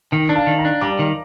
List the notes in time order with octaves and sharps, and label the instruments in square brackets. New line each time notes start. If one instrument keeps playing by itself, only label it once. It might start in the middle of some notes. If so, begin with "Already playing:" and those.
[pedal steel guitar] D#3 [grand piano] D#5 G5
[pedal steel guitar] D4
[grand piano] F5 A5
[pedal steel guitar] D#3
[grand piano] G5 A#5
[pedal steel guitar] D4
[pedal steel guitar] G3 [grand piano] A#5 D6
[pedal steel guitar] D#3